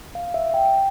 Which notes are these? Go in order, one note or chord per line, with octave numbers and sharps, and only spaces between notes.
F5
E5
G5